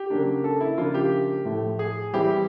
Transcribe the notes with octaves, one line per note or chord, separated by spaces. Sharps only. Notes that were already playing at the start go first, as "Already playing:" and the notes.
Already playing: G4
C#3 F#3 A#3 D4
A4
E4
C#3 F3 A#3 D4 F4
G4
A2 F3 A3
G#4
E3 G3 C4 E4 G4